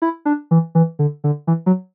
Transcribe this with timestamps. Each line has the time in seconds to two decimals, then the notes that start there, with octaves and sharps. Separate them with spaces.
0.02 E4
0.25 D4
0.51 E3
0.75 E3
0.99 D3
1.24 D3
1.47 E3
1.66 F#3